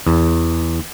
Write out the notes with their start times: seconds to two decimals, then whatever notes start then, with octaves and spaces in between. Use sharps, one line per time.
0.07 E2